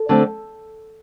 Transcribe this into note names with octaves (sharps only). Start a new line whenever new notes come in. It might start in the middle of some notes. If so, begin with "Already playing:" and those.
Already playing: A4
D3 A3 C4